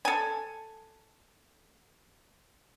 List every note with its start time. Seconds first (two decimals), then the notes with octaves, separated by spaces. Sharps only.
0.05 A4 G#5